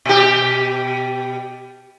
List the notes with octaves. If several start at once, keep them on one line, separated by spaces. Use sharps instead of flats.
B2 G4